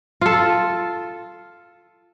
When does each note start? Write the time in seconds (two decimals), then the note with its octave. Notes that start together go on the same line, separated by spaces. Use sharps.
0.21 F4 A4